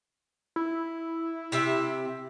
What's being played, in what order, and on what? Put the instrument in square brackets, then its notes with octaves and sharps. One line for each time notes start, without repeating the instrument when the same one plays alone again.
[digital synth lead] E4
[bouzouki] C3 G4 E5